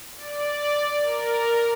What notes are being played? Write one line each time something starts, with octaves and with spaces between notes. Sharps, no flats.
D5
A#4